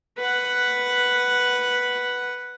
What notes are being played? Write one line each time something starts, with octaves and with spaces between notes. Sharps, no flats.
B4 F#5